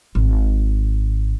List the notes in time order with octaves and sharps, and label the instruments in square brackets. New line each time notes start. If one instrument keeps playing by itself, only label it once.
[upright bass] G#1